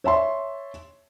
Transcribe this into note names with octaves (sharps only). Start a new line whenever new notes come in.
C#5 E5 A5 C6